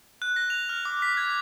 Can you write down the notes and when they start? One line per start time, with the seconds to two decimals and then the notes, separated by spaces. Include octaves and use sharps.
0.22 F#6
0.36 A#6
0.50 F7
0.69 F6
0.85 D6
1.02 B6
1.17 G#6